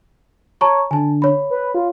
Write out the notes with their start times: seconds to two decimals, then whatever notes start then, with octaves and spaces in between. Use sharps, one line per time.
0.61 C#5 A5 A#5 C#6
0.91 D3 G#5 A5
1.22 C#5 B5
1.50 B4
1.75 F4